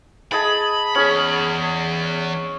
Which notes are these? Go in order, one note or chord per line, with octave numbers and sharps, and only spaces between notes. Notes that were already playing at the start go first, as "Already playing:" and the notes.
G#4 D#5 A5 B5
E2 C#4 G#4 B5